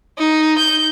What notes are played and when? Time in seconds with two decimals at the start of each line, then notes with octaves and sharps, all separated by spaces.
0.18 D#4
0.58 G6